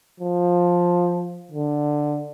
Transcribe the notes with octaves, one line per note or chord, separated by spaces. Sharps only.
F3
D3